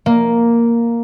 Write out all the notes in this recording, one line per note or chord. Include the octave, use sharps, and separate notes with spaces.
A#3